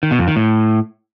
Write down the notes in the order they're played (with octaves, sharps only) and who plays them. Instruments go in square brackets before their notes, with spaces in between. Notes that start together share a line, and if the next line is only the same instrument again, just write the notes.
[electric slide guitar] D#3
B2
F2
D#3
A2